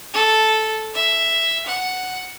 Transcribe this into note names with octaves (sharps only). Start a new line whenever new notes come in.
A4
E5
F#5